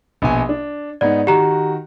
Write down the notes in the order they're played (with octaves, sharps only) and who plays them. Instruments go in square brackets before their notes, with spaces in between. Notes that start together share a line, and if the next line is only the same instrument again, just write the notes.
[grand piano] A#1 B2 G#5
D4
[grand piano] G#2 B3 D#4 [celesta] D5
[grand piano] D#3 F#4 [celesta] G4 A#5